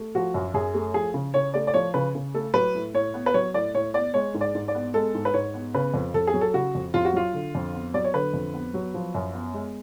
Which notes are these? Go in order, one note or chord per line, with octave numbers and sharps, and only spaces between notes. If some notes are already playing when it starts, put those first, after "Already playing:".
Already playing: A3
F3 F#4
F#2
F#2 G#4
A3
F3 G#4
C#3
C#3 C#5
A3 D5
D5
F3 C#5
C#3 B4
C#3
A3 A4
F#3 B4
A2
A2 C#5
B3
B4
F#3 C#5
A2 D5
A2 C#5
B3 D5
G#3 C#5
G#2
D5
G#2
D5
B3
G#3 A4
G#2
B4
G#2 C#5
B3
C#3 B4
F2
F2 A4
G#4
F#3
A4
C#3 F#4
F2
F2 F4
F#4
F#3 F4
D3
F2
B3
F#3 D5
C#5
D3 B4
F2
B3
F#3
F3
F#2
B3
G#3